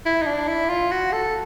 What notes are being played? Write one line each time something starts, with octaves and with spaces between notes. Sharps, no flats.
E4
D#4
D4
E4
F4
F#4
A4